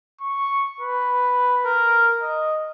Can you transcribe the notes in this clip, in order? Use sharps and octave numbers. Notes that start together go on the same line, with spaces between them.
C#6
B4
A#4
D#5